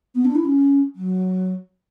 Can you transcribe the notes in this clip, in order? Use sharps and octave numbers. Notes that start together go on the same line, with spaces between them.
B3
D4
E4
C#4
F#3